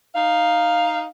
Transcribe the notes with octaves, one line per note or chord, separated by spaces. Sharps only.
D#4 F5